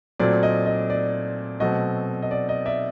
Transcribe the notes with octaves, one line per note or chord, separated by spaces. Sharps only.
A#2 F#3 A3 C4 D5
D#5
D#5
D5
B2 F#3 A3 C4 D#5
D#5
D5
D#5
D5 E5